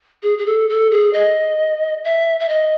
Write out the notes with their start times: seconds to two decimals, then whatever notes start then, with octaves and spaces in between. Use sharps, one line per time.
0.23 G#4
0.38 G#4
0.46 A4
0.69 A4
0.91 G#4
1.13 D#5
2.05 E5
2.40 E5
2.49 D#5